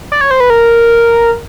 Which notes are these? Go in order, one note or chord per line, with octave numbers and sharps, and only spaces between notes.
D5
C#5
C5
B4
A#4